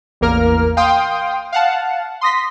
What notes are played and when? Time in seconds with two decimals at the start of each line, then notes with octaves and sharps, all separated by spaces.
0.21 A1 E2 A#3 A#4 F6
0.77 F5 G5 C6 D#6
1.52 F5 F#5 A5
2.21 C6 D#6 A#6 B6